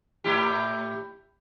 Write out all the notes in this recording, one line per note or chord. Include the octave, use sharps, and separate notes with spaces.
A2 E4 G4